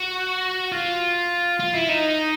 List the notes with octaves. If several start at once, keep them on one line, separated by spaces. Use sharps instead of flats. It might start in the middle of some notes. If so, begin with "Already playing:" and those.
Already playing: F#4
F4
F4
E4
D#4